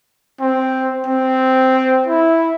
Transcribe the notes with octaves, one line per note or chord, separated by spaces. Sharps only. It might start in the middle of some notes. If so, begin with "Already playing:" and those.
C4
C4
E4